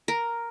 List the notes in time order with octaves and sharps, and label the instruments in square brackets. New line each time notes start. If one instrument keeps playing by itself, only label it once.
[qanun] A#4